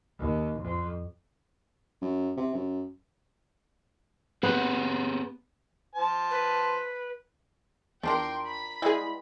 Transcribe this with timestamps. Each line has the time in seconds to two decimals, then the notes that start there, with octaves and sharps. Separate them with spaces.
0.19 D#2
0.58 F2
2.02 F#2
2.37 C3
2.54 F#2
4.43 B3 C4 G4 G#4
5.95 C5 A5
6.31 B4
8.03 E2 F3 D4 A#4 G5 C6
8.46 B5
8.82 G3 G#3 B3 E4 G#4